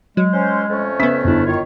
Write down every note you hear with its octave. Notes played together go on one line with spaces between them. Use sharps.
F#3 G#3
C#4 C5
F2 A3 C#4
C#3 B3 E5 B6
G1 D4 E4
D#3 F4 C#5